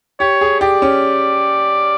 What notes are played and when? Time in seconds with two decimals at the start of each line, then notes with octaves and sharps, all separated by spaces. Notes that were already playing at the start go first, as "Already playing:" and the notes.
0.20 G4 C#5
0.41 G#4
0.61 G4 D5
0.82 C#4